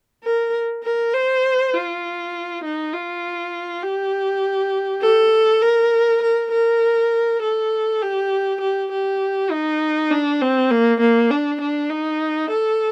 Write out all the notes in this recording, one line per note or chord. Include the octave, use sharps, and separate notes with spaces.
A#4
A#4
C5
F4
D#4
F4
G4
A4
A#4
A#4
A#4
A4
G4
G4
G4
D#4
D4
C4
A#3
A#3
D4
D4
D#4
A4